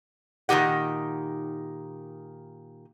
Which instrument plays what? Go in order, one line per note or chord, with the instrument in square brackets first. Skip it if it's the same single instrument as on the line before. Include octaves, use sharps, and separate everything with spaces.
[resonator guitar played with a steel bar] A#2 D#3 D#4 G4 F#5